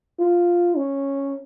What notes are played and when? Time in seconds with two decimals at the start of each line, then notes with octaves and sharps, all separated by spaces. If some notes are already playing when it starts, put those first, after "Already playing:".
0.19 F4
0.77 C#4